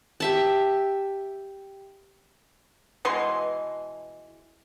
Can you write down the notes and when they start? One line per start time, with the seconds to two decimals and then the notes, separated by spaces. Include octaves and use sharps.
0.20 G4 E5 A5
3.05 B2 E3 G#3 C6